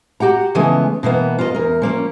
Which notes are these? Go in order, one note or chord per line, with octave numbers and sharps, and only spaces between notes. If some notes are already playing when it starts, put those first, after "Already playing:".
F#4 G4 F#5 A#5
C#3 E3 F3 G#3 A3 B3
B2 E3 A#3 B3
F4 A#4 B4 D#5
E2 A#4
F3 A#3 C#4